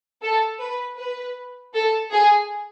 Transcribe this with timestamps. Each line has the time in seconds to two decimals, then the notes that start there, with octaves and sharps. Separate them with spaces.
0.22 A4
0.60 B4
0.98 B4
1.74 A4
2.12 G#4